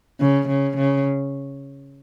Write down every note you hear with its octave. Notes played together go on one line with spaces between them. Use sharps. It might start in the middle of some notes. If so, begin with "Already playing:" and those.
C#3
C#3
C#3